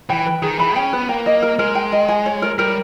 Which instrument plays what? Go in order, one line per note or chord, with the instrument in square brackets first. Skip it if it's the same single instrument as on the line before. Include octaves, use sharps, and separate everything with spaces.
[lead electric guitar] E3 [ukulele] G5
[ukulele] B4
[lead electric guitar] D#3 [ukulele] G#4
[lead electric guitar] E3 [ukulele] B5
[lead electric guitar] C#4 [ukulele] G5
[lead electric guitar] B3 [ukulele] B4
[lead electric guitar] A#3 [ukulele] G5
[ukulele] D#5
A#4
[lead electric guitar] G#3 [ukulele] A#4
[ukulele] G5
D#5
G#5
C#5
A#4
[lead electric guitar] G3 [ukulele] A#4